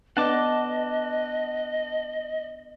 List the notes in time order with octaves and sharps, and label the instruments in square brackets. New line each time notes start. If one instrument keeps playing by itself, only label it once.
[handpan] B3 D4 [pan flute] D#5 [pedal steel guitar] F#5 A5 D6